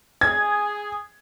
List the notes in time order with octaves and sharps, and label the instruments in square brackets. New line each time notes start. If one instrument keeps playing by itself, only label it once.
[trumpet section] G#4 [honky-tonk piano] G#6